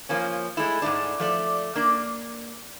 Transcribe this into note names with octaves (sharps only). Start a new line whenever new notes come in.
F3 A#3 C#4
G#3 A3 E4
G#2 G#3 A3 D4
F3 A3 D5
A#3 D4